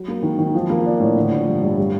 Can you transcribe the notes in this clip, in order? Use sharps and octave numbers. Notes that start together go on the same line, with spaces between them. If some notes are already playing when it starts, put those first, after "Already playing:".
Already playing: F#3
A#3
D#3
D#3
F3
A#3
D4
A2
D3
F3
G2
G2
G3